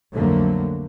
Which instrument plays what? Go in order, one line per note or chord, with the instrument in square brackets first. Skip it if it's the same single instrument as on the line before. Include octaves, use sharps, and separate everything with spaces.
[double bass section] B1 F2 D3 F#3 A3 A#3